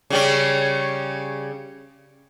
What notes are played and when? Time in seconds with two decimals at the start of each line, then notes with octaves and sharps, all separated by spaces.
0.10 C#3 G3 C#4